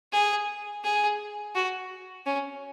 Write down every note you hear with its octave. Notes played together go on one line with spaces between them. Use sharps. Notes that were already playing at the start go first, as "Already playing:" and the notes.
G#4
G#4
F#4
C#4